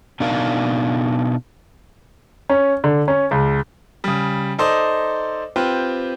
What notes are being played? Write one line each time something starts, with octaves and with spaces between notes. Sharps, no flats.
B2 D4 D#4 A#4 F5
C#4
D3
C#4
C#2
C#3 G3
D#4 A4 C5 D5 D#5
C4 F4 G4 B4